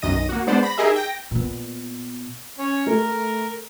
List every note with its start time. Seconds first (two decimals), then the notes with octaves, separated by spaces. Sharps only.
0.02 B1 F#2 D#3 D#5 A#6 D#7
0.29 A#3 F#4
0.47 G#3 B3 D4 C5 D5
0.63 B5 A#6
0.78 D#4 G4 G#4 A#4 D#5 E5
0.96 G5 A#6
1.31 A#2 B3
2.59 C#4 C#5
2.87 A3 A#4